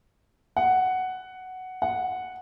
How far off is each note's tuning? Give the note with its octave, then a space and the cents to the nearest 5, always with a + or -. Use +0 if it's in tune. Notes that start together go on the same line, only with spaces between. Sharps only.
F#5 +5
F#5 -5